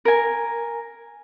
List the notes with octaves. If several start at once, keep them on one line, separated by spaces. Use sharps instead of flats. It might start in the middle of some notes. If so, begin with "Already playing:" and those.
A#4 G#5